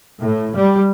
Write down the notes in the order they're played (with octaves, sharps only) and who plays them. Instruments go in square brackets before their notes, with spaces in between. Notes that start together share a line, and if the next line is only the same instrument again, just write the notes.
[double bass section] A2
G3